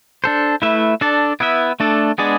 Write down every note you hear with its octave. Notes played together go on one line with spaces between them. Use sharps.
D4 A4 C5
A3 E4 B4 E5
D4 A4 D5
B3 E4 B4 E5
A3 D4 A4 D5
G#3 B3 D4 G#4 D5